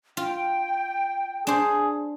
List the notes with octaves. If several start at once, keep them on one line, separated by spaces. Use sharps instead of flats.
F4 G5
D4 G#4 C5